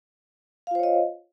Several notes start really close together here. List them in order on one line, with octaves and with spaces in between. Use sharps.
F5 F4 C5 C#5 D#5